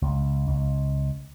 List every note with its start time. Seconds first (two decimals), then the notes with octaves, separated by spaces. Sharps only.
0.02 C#2
0.47 C#2